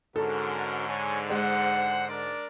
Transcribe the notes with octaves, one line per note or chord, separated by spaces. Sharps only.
G#2 D3 C#4 F#4 A4 A#4
C#5 G#5
G#3 C5 F#5
D4 A#4 D5